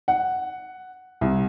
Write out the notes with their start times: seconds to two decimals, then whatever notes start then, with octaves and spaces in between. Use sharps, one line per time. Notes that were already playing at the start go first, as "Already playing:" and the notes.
0.08 F#5
1.21 C2